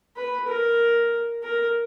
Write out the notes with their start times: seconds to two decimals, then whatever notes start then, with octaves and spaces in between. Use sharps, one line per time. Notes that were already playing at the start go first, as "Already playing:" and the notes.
0.16 B4
0.48 A#4
1.43 A#4